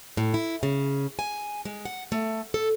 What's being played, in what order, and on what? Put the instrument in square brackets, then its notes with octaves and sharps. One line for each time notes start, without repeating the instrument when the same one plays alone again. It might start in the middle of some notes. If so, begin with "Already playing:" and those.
[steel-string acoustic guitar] A2
E4
C#3
G#5
G#3
F#5
A3
A4